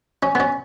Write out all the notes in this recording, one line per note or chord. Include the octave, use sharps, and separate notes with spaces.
C#4
B3
C#4